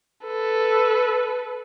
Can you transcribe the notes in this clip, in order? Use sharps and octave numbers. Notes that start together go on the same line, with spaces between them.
A4 B4